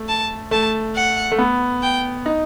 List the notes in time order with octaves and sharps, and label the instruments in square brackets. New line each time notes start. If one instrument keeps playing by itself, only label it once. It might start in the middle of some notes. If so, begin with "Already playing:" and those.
Already playing: [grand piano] A3
[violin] A5
[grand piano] A3 [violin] A5
[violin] F#5
[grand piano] A3
B3
[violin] G5
[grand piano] D#4